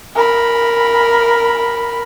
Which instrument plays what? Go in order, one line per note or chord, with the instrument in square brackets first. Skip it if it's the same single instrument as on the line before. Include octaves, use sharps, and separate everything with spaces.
[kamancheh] A#4 B5